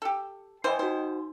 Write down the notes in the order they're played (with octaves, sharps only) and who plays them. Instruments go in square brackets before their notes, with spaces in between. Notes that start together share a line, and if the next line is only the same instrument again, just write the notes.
[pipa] G4 A4
[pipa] E3 C5 [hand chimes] D#5 G5 G#5
[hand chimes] D#4 F#4 [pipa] C5